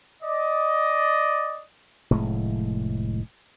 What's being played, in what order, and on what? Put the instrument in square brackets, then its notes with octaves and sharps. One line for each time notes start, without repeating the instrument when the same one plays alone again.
[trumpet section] D5 D#5
[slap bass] F1 A2 G#3